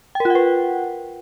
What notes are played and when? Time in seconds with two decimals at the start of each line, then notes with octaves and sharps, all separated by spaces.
0.15 G5
0.20 A#4
0.25 F4
0.30 F#5
0.35 B4